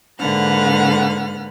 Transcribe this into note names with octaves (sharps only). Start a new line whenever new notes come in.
G#2 D3 A#3 B4 F#5 F6